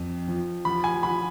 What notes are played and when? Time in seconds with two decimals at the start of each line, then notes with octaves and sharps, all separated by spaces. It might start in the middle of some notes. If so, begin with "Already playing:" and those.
Already playing: F2
0.28 F3
0.65 F3 B5
0.84 G#5
1.03 F3 B5